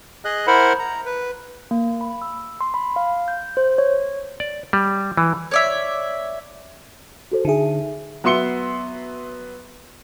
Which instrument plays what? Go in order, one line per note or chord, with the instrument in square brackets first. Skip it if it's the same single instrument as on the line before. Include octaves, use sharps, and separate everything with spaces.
[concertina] G#4 D#5 F#6
E4 A#4 C5 F#5 B5
A#5
B4
[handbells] A#3
B5
E6
C6
B5
F5
G6
C5
C#5
[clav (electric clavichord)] D5
G3
E3
[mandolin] C#5 D5 E5
[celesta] F#4 A4 C5
[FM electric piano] D3 G#4 [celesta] D#4 E5
[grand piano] F#3 B3 E5 C6 C#7 G7